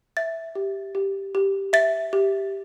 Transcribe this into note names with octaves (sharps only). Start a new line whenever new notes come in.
E5 A6
G4
G4
G4
E5 A6
G4